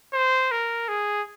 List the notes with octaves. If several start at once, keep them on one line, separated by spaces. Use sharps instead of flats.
C5
A#4
G#4